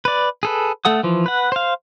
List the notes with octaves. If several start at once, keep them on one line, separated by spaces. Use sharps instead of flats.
B4 D5
G#4 A4 B4
A3 A4 F#5 D#6
E3 F3
B4 F#5
C5 F5